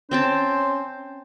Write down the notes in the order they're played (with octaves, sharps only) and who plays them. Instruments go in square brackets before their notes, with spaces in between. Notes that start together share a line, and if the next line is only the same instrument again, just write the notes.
[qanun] C4 G5 A5 [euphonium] C#4 [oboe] C5